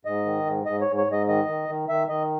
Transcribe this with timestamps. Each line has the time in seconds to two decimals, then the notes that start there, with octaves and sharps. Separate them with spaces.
0.05 G#2 D#5
0.26 D#3
0.46 G#2
0.66 G#2 D#5
0.81 C#5
0.87 G#2
0.98 C#5
1.07 G#2
1.12 D#5
1.28 D#3 D#5
1.48 D#3
1.68 D#3
1.89 D#3 E5
2.09 D#3 D#5